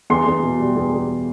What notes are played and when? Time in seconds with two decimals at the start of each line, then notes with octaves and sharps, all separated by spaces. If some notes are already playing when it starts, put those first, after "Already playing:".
0.10 E2 C6
0.26 E2
0.43 B2
0.60 G3
0.76 E2
0.93 E2